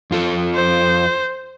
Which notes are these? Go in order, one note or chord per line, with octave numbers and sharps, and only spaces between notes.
F2 F4 A4
C5